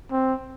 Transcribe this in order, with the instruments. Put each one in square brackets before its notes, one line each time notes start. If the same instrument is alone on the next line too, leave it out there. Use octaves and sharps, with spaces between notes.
[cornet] C4